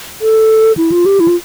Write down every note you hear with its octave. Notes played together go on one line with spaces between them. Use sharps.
A4
E4
F4
G4
E4
F4